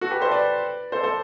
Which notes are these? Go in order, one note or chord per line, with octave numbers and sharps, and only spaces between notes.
F#4 A4
G4 B4
A4 C5
B4 D5
A4 C5
A4 C5